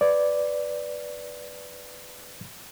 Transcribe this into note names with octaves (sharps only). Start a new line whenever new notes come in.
B4 D5